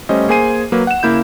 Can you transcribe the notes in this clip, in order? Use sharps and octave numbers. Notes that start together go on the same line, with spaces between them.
G3 A3 C#4 C5 D#5
A#3 G#4 C5 G#5 C7 D#7
F#3 A#3 B4
F#5 E7
C#3 A#3 E4 G6